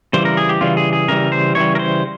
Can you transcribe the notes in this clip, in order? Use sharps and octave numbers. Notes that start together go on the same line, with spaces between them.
C#3 E3 G3 C5
A#4
G#4
G4
C#3 E3 G3 F4
G#4
G#4
C#3 E3 G3 A#4
C5
C#3 E3 G3 C#5
A#4
C5